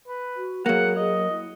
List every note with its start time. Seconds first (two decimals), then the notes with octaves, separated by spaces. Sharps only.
0.08 B4
0.36 F#4
0.66 F#3 A#3 G#4 F#5
0.97 G#4 D#5
1.30 E4